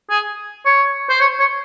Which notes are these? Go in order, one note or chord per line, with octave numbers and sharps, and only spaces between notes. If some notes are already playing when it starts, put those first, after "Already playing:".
G#4
C#5
C5
C#5
C#5